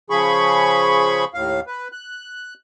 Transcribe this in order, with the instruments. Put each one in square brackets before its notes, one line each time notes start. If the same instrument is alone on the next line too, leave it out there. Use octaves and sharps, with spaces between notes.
[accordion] C#3 F3 G#4 B5 C#6
D#2 A2 F5
B4
F#6